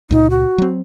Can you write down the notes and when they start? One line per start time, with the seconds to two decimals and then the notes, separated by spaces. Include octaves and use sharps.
0.11 C#2 A#2 D#4
0.30 F#4
0.58 F#3 C4